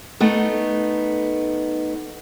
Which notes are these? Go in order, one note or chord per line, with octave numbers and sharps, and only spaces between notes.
A3 B3 D#4